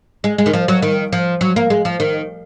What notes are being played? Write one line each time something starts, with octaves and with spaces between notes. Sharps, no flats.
G#3
G#3
D#3
F3
F#3
D#3
F3
F#3
A#3
G#3
F3
D#3